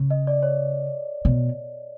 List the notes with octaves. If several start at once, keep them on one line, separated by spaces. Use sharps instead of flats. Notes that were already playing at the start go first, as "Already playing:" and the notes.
Already playing: C#3
D#5
D5
C#5
B2